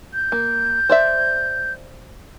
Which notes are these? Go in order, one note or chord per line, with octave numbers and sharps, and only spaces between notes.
G6
A#3
C5 D5 E5